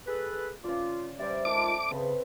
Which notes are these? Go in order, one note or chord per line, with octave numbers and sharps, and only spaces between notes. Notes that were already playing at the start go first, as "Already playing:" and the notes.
G#4 A4 B4
C#3 F4 D5
G3 C5 D5 E5
D#3 G#3 F4 A4 D6
C#3 C4 B4